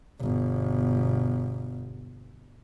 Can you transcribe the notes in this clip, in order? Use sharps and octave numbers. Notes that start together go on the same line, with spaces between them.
G1 B2